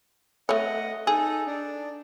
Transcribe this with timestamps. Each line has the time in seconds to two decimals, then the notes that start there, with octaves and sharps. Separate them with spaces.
0.49 A3 C#5 D#5 F#5
1.07 D#4 G#4 A4
1.47 D4